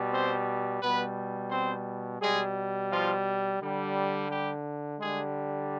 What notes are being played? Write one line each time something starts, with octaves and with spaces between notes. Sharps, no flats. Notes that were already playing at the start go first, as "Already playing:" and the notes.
Already playing: B2 G3
C4 C5
B2 G3 B3 B4
C4 C5
B2 G3 G#3 G#4
F3 F4
D3 G3
G3 G4
D3 G3 G#3 G#4